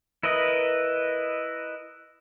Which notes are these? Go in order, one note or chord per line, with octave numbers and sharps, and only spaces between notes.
E4 A#4 B4 D#5